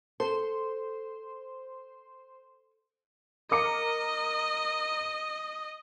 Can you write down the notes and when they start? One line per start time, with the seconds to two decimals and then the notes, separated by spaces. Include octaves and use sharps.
0.20 A4 C5
3.51 A#4 D#5 D6 C#7